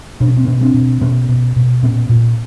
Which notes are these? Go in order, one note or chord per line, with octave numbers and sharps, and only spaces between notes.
B2 D4
C#4
C4
B2 B3 C#4
C4 D4
B2
B2 B3 C#4
B2
B2
A#2 B3 C#4
A#2